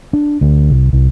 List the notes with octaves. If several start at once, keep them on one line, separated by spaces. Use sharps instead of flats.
D4
D2
C2
C2